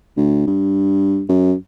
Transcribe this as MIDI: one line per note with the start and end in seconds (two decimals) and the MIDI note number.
0.17 0.44 38
0.47 1.24 43
1.29 1.54 42